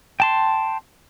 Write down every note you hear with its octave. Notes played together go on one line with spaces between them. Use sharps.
G5 A5 C6